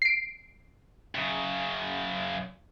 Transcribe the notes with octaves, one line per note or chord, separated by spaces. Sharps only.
C7 D7
F#2 C#3